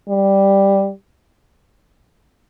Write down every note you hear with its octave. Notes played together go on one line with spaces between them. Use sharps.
G3